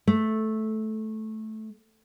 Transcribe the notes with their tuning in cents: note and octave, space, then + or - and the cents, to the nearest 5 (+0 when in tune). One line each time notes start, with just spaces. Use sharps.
A3 -10